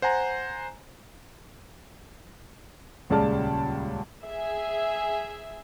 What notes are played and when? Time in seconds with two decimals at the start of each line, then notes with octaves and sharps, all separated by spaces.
0.02 C5 F#5 G#5 A#5
3.10 D#1 C#2 C#3 D5 A5 F6
4.24 G#4 E5 G#5